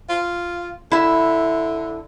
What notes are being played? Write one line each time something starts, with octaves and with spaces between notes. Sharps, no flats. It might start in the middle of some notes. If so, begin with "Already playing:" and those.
F4
D3 E4 E5